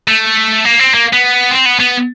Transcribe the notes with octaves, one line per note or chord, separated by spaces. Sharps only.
A3
A#3
C4
A#3
B3
C4
B3
B3